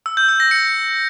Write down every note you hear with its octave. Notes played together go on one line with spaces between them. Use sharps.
E6
G6
E6
A#6
C#7